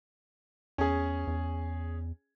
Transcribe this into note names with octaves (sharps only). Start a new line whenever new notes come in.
E2 C#4 G#4
E2